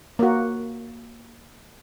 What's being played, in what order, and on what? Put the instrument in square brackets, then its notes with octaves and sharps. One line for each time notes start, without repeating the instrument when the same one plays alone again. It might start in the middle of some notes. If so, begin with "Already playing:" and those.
[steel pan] A#3 F#4